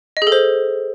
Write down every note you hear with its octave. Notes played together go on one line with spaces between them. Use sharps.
D#5
G#4
A4
C5